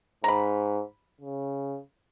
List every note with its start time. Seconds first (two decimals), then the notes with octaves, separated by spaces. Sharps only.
0.24 G#2 A#5 B5
1.21 C#3